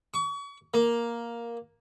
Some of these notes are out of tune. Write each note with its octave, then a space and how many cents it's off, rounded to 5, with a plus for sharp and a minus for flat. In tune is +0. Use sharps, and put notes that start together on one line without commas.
C#6 +35
A#3 +5